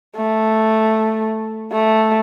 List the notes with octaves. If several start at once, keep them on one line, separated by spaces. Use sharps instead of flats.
A3
A3